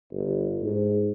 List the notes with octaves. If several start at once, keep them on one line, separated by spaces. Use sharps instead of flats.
G1
G#2